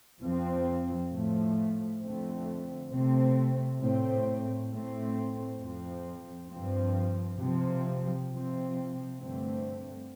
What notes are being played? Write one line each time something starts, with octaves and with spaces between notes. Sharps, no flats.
F2 F3 C4
A2 F3 A3
F2 D3 A3 C4
C3 A3 C4
A2 A3 C4
A2 A3 C4
F2 F3 C4
G2 F3 C4
C3 F3 C4
C3 F3 C4
G2 D3 A3 C4